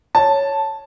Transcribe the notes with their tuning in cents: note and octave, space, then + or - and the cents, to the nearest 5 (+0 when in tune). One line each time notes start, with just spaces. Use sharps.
C#5 +0 A5 +0